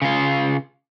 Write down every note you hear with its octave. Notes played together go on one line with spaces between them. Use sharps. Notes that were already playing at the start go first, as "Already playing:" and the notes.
C#3 F4